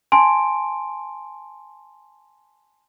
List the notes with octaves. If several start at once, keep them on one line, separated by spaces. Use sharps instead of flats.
G#5 A5 C6 D7